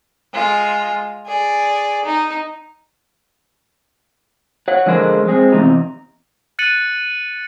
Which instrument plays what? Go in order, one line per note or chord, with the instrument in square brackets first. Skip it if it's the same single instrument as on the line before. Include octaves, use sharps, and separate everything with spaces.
[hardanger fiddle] G#3 F4
G#4 D5
D#4
[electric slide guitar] C#5 F#5
D3 F3 G#3 G#4 A#4 C5
G#3 C4 G#4
E2 C3 D#4
[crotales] F#6 A6 C#7 D#7 F#7